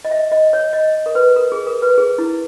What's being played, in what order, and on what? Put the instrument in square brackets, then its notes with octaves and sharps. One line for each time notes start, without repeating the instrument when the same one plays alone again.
[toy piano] D#5
E5
D#5
C#5
D#5
A#4
B4
A#4
G#4
A#4
B4
G#4
E4